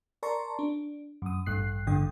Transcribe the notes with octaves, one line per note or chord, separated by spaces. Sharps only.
A#4 D5 A5 A#5 C6 C#6
D4
F#2 D#6
A1 G2 F#6 C7
A1 G2 D3 G5 D#6